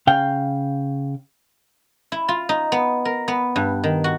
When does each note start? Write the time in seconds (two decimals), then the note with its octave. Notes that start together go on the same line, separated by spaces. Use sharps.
0.07 C#3 F5 G5
2.12 E4
2.28 F4
2.49 D#4
2.72 B3
3.05 A#4
3.28 B3
3.56 G2
3.84 D#3
4.04 F#4